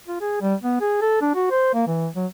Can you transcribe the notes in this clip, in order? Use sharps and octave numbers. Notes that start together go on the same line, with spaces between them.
F4
G#4
G3
B3
G#4
A4
D4
F#4
C5
A#3
E3
F#3